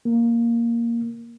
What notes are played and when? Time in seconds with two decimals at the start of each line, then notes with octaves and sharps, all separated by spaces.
0.05 A#3